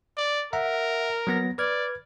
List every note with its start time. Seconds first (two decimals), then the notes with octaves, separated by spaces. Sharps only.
0.17 D5
0.53 A#4 E5 F#5 A#5
1.27 F#3 B3 A#6
1.58 B4 D5 F6 G#6